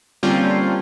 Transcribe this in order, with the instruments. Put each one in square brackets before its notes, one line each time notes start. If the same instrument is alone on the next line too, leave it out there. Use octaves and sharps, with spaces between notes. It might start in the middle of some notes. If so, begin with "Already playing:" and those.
[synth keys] D3 G3 A#3 C4 C#4 F4